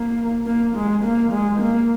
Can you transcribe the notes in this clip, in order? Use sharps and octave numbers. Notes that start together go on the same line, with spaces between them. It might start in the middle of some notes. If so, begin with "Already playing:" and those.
Already playing: A#3
A#3
G#3
A#3
G#3
A#3